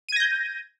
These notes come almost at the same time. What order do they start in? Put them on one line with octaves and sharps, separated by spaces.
D#7 G#6 A#6 G6